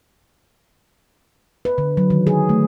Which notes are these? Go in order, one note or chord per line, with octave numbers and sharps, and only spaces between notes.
B4
D3
F#3
D#3
G#4
A3